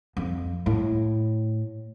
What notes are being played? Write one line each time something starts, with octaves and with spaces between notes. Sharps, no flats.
F2
A2